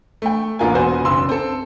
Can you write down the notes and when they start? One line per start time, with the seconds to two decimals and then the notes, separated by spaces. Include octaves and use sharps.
0.22 A3 G5
0.59 A1 A#3 F4 A#4 G#5
0.73 E1 B3 F#4 B4 C5 G#5
1.04 F#1 B1 C6 E6
1.29 C4 A4